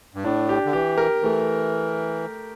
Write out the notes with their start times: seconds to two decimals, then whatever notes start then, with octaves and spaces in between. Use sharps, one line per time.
0.15 G2
0.24 A2 D4
0.49 G4
0.65 D3
0.73 E3 G4
0.98 A#4
1.23 E3 A3